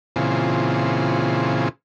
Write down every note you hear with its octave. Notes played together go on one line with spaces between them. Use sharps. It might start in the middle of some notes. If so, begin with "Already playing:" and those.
A#2 C#3 E3 C4 F4 G#4